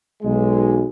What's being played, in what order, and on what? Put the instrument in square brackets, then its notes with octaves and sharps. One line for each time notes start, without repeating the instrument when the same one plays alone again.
[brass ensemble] B1 G#3